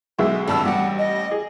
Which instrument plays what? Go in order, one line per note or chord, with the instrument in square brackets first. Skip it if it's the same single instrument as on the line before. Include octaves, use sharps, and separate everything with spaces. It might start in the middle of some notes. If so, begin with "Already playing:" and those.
[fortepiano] B1 G#3 E5 [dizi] G#4
[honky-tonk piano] G#1 G2 E6 [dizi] A5
[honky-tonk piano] A1 G3 [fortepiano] G4 [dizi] F#5
[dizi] D#5
[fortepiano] G#4